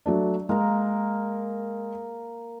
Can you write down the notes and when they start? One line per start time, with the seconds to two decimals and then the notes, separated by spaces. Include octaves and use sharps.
0.06 F#3 A3 D4
0.49 G#3 A#3 A#4 A#5